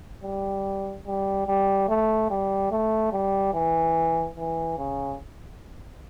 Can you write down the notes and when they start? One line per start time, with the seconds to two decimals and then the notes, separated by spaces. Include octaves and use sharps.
0.23 G3
1.06 G3
1.47 G3
1.89 A3
2.31 G3
2.72 A3
3.13 G3
3.54 E3
4.36 E3
4.78 C#3